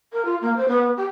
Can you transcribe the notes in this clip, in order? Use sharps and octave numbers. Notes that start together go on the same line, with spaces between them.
A#4
F4
A#3
C5
B3
G4